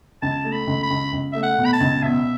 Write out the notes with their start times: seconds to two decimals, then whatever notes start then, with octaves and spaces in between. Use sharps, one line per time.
0.22 C#2 A5
0.45 A3
0.52 B5
0.67 C#2
0.83 B5
0.90 C#2
1.13 C#2
1.32 A3 E5
1.43 F#5
1.58 B2
1.66 B5
1.73 A5
1.81 C#2
2.03 B2 E5